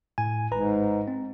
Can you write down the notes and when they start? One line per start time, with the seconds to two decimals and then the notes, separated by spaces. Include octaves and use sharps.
0.18 A2 G#5
0.51 G#1 G#2 B4 A#5
1.08 C4